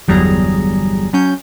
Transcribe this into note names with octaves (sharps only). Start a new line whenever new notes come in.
G1 E2 F#3 G3 G#4 A#5
F#3 C#4 G6